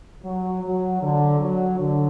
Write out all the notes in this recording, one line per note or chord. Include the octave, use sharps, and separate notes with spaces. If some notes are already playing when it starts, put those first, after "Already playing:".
F#3
F#3
D3
F#3
D3